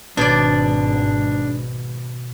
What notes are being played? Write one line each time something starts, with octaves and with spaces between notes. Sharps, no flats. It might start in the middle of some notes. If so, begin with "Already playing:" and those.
G#1 G#2 B2 D4 D5